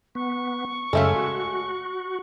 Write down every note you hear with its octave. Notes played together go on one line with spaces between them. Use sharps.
B3 C#6
F#2 C#3 G#3 A3 C#4 A4 E5 F5
F#4